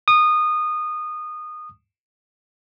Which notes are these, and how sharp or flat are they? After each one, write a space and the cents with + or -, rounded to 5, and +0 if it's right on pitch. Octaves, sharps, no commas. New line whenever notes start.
D#6 -20